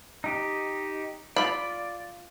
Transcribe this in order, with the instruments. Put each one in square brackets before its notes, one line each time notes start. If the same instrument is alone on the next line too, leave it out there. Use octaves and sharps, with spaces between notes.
[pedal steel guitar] D#4 G4
[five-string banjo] F4 B5 [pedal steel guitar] D5